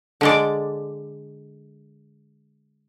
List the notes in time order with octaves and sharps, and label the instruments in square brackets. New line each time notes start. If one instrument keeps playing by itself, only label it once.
[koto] D3 G#3 D5